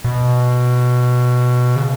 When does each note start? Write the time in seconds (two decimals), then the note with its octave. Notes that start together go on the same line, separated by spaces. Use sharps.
0.04 B2
1.76 C#3